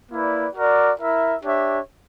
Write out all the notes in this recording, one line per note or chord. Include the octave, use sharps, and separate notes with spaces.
A#3 E4 B4 D5
F#4 A#4 D5
E4 A#4 E5
D4 G4 C#5 E5